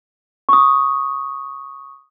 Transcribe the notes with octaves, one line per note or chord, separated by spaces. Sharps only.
C#6 D#6